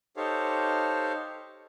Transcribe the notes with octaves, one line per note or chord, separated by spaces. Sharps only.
D#4 G4 A4 C5 C#5 F5